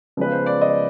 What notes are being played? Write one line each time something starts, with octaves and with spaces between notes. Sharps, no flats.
C#3 F3 G#3 B3 B4
C5
D5
D#5